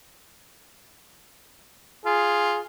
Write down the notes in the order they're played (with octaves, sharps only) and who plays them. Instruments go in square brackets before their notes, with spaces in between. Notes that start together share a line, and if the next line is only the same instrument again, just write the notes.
[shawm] F4 [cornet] G#4